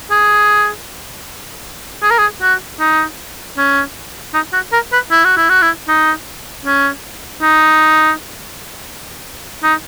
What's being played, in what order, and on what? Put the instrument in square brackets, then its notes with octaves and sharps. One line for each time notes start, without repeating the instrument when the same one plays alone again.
[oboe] G#4
G#4
A#4
G#4
F#4
D#4
C#4
D#4
F#4
A#4
B4
E4
F#4
E4
F#4
E4
D#4
C#4
D#4
D#4